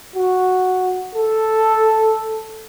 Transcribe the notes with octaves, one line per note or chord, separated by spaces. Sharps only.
F#4
A4